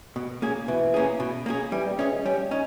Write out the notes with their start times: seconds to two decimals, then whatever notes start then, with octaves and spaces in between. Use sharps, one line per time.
0.16 B2
0.42 A#3 C#4 G#4
0.68 B2 E3
0.94 A#3 C#4 G#4
1.20 B2
1.46 A#3 C#4 G#4
1.72 E3 G3
1.85 G3
1.99 E3 C#4 G#4
2.12 G#3
2.26 G3 C#4
2.51 C#4 D#4